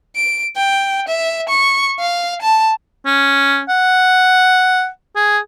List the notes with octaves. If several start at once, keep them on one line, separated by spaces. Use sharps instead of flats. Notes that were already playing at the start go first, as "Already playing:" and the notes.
D7
G5
E5
C#6
F5
A5
C#4
F#5
G#4